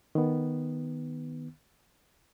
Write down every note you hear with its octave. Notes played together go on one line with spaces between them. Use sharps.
D#3 B3